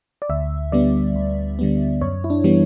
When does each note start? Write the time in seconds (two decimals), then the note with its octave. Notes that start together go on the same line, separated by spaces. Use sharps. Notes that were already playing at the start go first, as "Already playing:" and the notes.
0.22 D5
0.30 D2 E5
0.72 D3 G3 B3 D5
1.15 D2
1.59 D3 G3 B3
2.01 F#2 C#5
2.24 E4
2.30 D4
2.44 E3 G3 B3